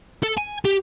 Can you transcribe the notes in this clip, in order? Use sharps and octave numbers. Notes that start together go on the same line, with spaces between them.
A4
G#5
G4